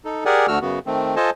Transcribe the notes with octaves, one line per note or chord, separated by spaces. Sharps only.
D#4 A4
G4 G#4 A#4 D5 F#5 G#5
D2 D3 A3 F#4 E6 F6
F#2 C#3 B3 F#4
D#3 A3 C4
F4 A4 C5 D#5 G#5 A5